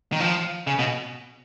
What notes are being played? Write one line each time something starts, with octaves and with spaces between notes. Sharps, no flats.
D#3
F3
C#3
B2